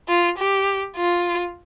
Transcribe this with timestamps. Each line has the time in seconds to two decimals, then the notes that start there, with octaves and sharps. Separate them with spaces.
0.08 F4
0.38 G4
0.96 F4